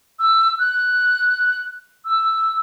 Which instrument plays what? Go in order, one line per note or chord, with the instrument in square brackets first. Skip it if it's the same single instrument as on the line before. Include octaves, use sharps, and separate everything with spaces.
[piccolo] E6
F#6
E6